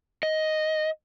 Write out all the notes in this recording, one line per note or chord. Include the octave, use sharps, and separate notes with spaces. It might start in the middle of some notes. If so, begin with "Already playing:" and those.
D#5